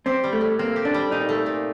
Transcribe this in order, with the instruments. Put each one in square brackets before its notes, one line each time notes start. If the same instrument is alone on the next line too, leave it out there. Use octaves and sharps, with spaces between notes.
[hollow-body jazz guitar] C4 [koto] G4
[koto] G3
[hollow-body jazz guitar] A3
[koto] A2
[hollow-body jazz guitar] A#3 [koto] C4
[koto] G4
[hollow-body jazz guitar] D4
[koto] G3
[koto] A#2 [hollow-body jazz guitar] D#4
[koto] A3
A#2